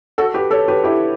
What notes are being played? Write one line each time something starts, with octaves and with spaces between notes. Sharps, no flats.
F#4 A4
G4 B4
A4 C#5
G4 B4
E4 G4